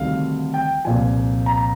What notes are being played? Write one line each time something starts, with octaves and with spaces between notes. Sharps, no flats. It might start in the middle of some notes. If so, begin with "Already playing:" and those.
Already playing: D2 C3 D#3 G3 F5
G5
C2 A#2 F3 G#5
A#5